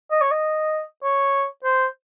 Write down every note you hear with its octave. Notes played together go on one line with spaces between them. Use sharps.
D#5
C#5
D#5
C#5
C5